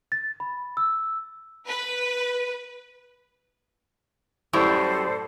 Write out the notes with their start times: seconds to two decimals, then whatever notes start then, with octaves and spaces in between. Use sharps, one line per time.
0.12 A6
0.40 B5
0.77 E6
1.68 B4
4.53 F#2 A2 G3 A4 C5 D5